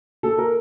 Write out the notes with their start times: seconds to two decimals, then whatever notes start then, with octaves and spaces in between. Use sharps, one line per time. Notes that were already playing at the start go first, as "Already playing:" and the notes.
0.23 A#3 A4
0.38 A#4